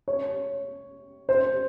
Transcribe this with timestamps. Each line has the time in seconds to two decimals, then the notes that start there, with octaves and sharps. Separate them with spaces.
0.08 C#5
1.29 C5